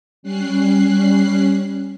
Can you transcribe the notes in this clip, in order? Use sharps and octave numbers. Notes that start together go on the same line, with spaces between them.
G3 C#4 F#6 C7